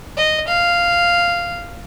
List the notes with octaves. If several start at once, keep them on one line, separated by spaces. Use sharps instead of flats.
D#5
F5